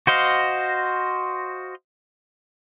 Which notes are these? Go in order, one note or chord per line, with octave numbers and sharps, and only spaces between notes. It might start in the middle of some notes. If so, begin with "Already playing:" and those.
F#4 C5 D#5 F5